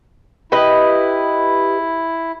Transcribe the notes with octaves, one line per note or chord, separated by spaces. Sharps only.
E4 G4 B4 D#5